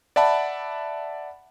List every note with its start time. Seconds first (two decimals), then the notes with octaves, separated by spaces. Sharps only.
0.16 D5 E5 F#5 A5 B5